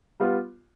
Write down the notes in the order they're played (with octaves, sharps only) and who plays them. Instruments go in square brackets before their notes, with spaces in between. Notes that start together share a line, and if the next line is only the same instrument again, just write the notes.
[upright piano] G3 B3 F4